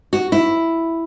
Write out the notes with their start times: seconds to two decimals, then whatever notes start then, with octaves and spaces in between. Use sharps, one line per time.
0.13 F#4
0.32 E4